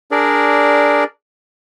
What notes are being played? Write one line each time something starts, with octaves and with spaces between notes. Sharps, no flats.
D4 G#4 A#4 D5